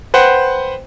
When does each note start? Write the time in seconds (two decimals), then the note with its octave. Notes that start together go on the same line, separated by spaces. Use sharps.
0.14 B4 C5 F#5 G5